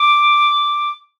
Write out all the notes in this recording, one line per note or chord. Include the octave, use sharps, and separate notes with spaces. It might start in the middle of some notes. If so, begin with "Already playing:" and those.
Already playing: D6